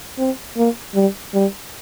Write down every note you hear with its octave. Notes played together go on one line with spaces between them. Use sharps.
C4
A#3
G3
G3